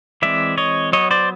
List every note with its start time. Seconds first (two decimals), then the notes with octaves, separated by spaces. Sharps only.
0.22 E3 G#3 C4 D5 E5
0.58 C#5 D#5
0.93 F#3 B3 C#5 D#5
1.11 C5 D5